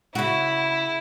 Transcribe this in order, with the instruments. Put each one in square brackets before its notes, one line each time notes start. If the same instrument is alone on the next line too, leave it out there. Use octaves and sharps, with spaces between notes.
[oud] C#3 F#4 [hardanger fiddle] E4